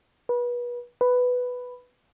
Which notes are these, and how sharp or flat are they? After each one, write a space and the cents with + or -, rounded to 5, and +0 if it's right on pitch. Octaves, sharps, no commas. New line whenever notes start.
B4 -30
B4 +5